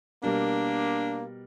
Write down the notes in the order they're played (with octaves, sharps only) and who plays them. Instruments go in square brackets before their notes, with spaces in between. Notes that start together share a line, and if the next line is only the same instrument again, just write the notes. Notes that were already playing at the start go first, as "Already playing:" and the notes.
[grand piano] B2 G3 A#4 [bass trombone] A#3 [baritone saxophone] D4